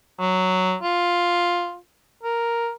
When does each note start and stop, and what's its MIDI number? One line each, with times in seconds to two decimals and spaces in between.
0.20 0.75 54
0.83 1.77 65
2.23 2.71 70